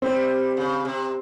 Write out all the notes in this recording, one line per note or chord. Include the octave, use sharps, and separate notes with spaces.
G3 C4
C#3
C3